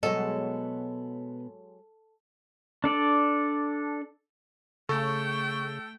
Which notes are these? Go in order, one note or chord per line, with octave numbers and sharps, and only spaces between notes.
B2 F#3 G#3 B3 A4 C#5 D#5
D4 A4 D5
C#3 A3 A4 G5 C#6